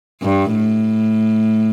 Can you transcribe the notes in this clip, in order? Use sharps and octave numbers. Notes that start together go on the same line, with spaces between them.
G2
A2